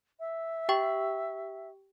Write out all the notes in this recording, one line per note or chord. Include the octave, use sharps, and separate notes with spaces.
E5
G4 G5 C#6